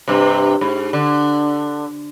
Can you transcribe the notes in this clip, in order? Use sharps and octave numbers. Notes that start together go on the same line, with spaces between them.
G2 C3
G#2
D3